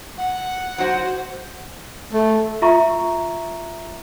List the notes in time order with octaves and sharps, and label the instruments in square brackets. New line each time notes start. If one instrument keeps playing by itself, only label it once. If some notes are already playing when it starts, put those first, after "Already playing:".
[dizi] F#5
[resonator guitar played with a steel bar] F#3 F#4 [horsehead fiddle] C5
[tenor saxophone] A3
[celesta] F4 E5 A#5 C#6